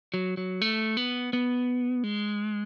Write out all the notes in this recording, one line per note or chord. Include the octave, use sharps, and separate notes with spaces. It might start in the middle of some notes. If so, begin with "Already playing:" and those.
F#3
F#3
A3
B3
B3
G#3